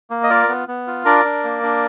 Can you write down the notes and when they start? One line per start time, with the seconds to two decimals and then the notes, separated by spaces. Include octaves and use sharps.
0.10 A#3
0.23 D#5
0.30 F4 A#4 D5
0.49 B3
0.68 B3
0.87 F4
1.05 D4 A#4 D5
1.25 D4
1.44 A#3
1.63 D4